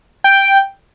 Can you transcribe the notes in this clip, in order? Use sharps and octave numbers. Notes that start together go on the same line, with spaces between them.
G5